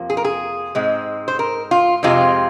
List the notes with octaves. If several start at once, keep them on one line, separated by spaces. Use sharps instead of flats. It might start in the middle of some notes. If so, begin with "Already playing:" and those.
Already playing: F2 C3 F3 A#3
G#4
A#4
G#4
G#2 G#3 C4
C5
A#4
F4
F2 C3 G#3 C4 F4